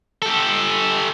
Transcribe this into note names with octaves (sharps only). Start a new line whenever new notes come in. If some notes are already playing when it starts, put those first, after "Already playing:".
G4 A4